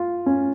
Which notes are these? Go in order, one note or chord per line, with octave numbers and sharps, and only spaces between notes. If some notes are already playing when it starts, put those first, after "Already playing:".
Already playing: F4
C#4